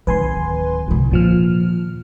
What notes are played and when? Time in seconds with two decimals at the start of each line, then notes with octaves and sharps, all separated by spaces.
0.07 D1 D#3 B4 G#5 C6
0.88 G1 C2
1.11 D#2 A#2 F3 F6